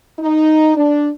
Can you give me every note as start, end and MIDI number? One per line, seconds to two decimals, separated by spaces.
0.19 0.73 63
0.75 1.08 62